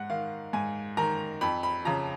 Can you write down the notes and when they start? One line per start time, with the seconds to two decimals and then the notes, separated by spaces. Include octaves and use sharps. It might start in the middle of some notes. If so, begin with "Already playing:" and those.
Already playing: G#2 F#5
0.10 D#3 F5
0.53 G#2 G#5
0.97 D#3 A#5
1.41 F2 B5
1.63 B5
1.85 C#3 F3 A#5